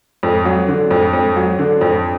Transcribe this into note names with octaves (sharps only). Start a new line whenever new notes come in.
F2
F#3
D3
F2
F2
F#3
D3
F2